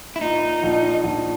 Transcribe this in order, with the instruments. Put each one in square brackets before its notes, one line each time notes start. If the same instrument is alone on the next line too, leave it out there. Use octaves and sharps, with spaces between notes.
[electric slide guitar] E4
[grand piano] A#2 [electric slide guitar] D#4
[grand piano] A#1
A#1